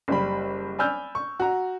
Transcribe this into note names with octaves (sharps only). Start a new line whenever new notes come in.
F#1 G3 B5
D5 G#5 B5 E6 F6 G6
C#6
F#4 A#5